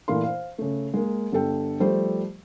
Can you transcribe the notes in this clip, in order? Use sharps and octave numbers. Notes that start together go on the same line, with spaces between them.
A#2 E3 A3 A#4 F5 C6
C5 F5
C#3 A3
G#3 A#3
G1 D3 A4 G5
F3 G3 A3 C5